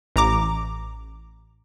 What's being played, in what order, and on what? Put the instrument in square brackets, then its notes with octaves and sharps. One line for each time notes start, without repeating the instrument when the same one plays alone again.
[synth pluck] A1 A#5 D6